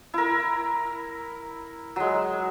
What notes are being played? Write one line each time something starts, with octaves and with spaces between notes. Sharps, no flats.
E4 A#4
F#3 G#3